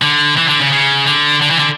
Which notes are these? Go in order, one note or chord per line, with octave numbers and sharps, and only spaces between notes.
D3
E3
D3
C#3
C#3
D3
D3
E3
D3